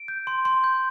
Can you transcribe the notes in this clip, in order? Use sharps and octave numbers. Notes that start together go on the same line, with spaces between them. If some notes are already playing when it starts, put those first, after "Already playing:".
Already playing: D7
G6
C6
C6
G6